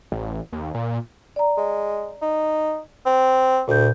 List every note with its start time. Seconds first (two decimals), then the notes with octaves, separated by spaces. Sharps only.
0.12 A1
0.52 D#2
0.74 A#2
1.36 D5 A#5
1.57 G#3
2.22 D#4
3.06 C4
3.68 D2 A#2 G6